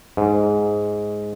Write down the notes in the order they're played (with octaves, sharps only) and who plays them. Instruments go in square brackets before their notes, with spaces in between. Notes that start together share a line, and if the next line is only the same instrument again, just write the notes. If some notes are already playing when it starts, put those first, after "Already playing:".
[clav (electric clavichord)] G#2